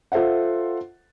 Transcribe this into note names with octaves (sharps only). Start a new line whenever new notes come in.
F4 A4 C5 E5 F#5